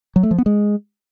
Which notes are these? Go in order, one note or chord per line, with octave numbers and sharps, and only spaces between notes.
F#3
A3
F3
B3
G#3